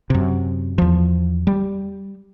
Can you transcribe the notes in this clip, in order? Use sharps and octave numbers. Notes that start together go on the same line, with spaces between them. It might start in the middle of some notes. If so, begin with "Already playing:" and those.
F#2 C3
E2 F3
G3